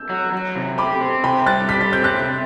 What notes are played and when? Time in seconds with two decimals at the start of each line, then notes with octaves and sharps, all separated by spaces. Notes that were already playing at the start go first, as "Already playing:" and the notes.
Already playing: E6 G6
0.09 F#3
0.33 F#3
0.55 C3
0.78 G4 B5 D6
1.01 C4
1.24 C3 G5 B5
1.46 G3 F#6 A6
1.69 G4 B6
1.81 A6
1.92 C4 G6
2.04 F#6 A6
2.15 C3